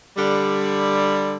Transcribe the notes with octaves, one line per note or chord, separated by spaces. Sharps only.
D3 G3